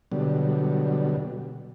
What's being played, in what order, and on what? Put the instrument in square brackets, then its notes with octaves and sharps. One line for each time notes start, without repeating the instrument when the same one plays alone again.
[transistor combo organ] B2 D3 F#3 G3